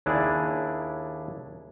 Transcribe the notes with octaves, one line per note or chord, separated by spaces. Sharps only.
D#2 D4 E4 G#4 D5